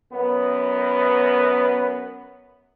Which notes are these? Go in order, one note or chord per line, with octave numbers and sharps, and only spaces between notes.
F#2 B3